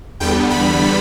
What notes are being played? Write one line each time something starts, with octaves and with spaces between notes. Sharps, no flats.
E2 D3 G3 B3 G5
B5